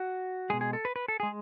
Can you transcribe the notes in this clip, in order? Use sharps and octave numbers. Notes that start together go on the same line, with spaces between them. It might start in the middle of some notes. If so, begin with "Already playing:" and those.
Already playing: F#4
B2 G#3 G#4
G#4
A4
B4
B4
A4
G#3 G#4